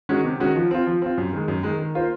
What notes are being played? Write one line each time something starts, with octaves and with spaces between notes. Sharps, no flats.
D#3 G#3 C#4 F#4
C3
D#3 G#3 C#4 F#4
F3
C4 F4
F3
C4 F4
F#2
D#3 G#3
F#2
D#3 G#3
D#3
A#3 F4 C5